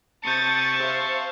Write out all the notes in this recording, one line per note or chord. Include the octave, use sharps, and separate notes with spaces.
C3 A5 C#6 D#6 G6 A6 C#7
C5 E5 F5